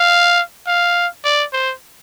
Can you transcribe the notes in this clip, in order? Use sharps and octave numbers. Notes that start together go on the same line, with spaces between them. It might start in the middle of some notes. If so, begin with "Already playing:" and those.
Already playing: F5
F5
D5
C5